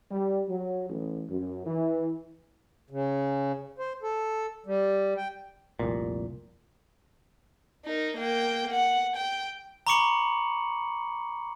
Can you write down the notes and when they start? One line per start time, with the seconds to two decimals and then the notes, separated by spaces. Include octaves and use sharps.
0.11 G3
0.49 F#3
0.90 A1
1.31 F#2
1.66 E3
2.90 C#3
3.79 C5
4.03 A4
4.66 G3
5.17 G5
5.79 F1 C2 A#2
7.85 D#4 A#4
8.17 A#3 G5
8.71 F#5
9.16 G5
9.87 A#5 B5 C#6 D6 C#7 F#7